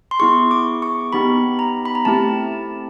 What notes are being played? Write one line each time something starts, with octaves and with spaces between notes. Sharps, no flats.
C6
B3 E4 G#4 C#6
D6
C#6
B3 D#4 G4 B5
A#5
B5
A#5
A3 C4 E4 G4 A5